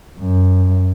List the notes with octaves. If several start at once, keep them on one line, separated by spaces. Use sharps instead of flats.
F#2